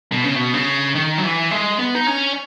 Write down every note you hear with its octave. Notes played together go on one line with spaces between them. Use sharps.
B2
C#3
B2
C#3
D#3
F#3
E3
G#3
B3
D#4
C#4